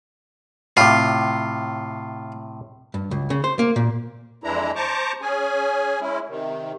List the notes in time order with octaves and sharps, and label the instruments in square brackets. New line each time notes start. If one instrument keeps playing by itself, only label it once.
[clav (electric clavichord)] A2 C3 [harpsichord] F4
[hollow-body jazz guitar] G2
C#2
C#3
C5
A#3
A#2
[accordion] F2 E3 G#3 D4 E4 A#5
C5 A5 A#5 C#6 D6
C#4 G#4 G#5
G#3 C#4 E4
C3 D#3